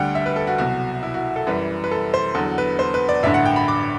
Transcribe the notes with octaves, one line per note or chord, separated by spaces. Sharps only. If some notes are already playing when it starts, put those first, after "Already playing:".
Already playing: D2 D3 G3 F#5 G5
E5
B4
A4
F#4
C2 B2 F#3 F#4
E4
F#4
A4
F#2 E3 G3 B4
B4
A4
C5
E2 D3 F#3 A4
B4
C5
B4
D5
A1 G2 D3 E5
F#5
G5
B5
D6